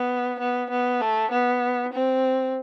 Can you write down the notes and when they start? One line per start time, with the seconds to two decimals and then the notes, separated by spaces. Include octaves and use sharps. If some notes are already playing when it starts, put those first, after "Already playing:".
Already playing: B3
0.39 B3
0.70 B3
1.01 A3
1.31 B3
1.93 C4